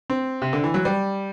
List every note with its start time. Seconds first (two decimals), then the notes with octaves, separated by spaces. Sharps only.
0.10 C4
0.42 C3
0.53 D3
0.64 E3
0.74 F#3
0.85 G3